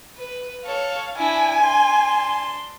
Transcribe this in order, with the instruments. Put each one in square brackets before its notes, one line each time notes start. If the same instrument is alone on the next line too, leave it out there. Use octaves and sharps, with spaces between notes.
[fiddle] B4
[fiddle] A4 C#5 [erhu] F5
[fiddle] D4 E4 [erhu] G#5
[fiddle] D4 C6